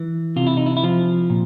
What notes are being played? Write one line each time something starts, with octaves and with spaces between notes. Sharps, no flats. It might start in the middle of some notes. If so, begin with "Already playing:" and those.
Already playing: E3
C3 F4
E4
D#4
E4
E4
F3 F4
A#2